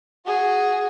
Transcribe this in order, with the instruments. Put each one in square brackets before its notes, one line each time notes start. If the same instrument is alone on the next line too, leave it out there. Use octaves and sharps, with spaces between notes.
[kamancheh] F#4 G#4